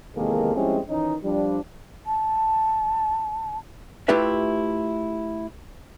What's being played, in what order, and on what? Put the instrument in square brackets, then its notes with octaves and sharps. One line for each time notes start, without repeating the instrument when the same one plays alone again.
[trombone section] E2 C3 D#3 G#3 A#3 A4
F3 G3 G#3 C4 C#4 E4
D#3 E3 C#4 D#4
F3 G3 D4
[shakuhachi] A5
[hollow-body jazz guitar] A3 E4 F4 G4 B4 E5